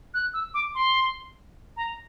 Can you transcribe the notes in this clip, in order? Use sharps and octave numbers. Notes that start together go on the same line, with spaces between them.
F#6
E6
D6
C6
A#5